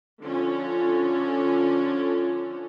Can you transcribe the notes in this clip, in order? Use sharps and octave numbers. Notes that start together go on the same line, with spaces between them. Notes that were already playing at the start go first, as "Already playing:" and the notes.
D3 F3 C#4